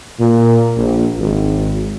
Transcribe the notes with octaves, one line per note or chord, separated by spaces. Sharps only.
A#2
A#1
G#1